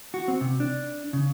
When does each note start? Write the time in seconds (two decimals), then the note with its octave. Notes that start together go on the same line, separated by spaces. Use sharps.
0.14 F#4
0.28 C4
0.41 C3
0.60 D4
1.13 C#3